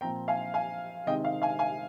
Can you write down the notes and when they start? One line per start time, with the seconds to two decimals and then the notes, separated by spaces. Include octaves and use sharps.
0.01 A#2 F3 C4 G5 A#5
0.28 F5 G#5
0.54 F5 G#5
1.06 C3 D#3 G#3 C4 D#5 G5
1.24 F5
1.42 F5 G#5
1.59 F5 G#5